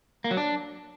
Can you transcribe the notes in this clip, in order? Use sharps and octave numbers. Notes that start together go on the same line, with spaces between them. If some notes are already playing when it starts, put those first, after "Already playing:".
A#3
F#3
D4